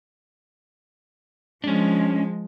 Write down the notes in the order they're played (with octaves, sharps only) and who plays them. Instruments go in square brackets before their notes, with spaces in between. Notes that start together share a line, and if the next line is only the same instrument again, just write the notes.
[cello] F3 G#3 [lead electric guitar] C#4 D4